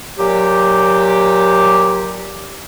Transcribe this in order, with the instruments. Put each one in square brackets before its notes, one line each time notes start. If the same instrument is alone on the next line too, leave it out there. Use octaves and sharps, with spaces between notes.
[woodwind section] A#2 F#3 G4